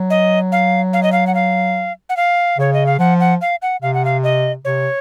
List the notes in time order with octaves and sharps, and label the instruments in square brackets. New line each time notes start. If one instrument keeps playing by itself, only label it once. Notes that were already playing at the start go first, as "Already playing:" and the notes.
Already playing: [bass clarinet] F#3
[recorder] D#5
F5
F5
D#5
F5
F#5
F5
F#5
F5
[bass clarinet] C#3 [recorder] C#5
[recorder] D#5
F5
[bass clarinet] F3 [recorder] F#5
[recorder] F#5
F5
F#5
[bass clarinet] C3 [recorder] F5
[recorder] F#5
F5
D#5
[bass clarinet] C3 [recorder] C#5